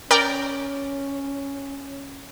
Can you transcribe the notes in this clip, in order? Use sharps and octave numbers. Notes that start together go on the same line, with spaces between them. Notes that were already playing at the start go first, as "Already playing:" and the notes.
C#4 A#4 D5 G5